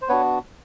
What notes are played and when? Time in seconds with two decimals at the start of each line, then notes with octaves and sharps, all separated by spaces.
0.02 C5
0.09 B3 D4 F#4 B4 C#5